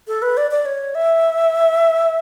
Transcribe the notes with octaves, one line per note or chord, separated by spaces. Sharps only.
A4
B4
D5
D5
C#5
E5